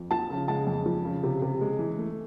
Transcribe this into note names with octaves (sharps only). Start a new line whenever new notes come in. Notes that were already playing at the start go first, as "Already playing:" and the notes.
Already playing: F2
F3 A5
C#3
G#3 A5
F2
F3
C#3
C3
C3
G#3
E3
A3